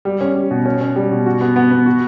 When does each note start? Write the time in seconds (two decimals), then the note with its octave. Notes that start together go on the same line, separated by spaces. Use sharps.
0.05 G3
0.21 C#4
0.35 G3
0.51 B2
0.66 C#4
0.81 C#4
0.96 G3
1.11 B2
1.26 F#4
1.41 B3
1.56 B3
1.71 B3
1.86 F#4